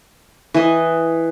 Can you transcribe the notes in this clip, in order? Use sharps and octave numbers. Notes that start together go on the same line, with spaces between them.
E3 D#5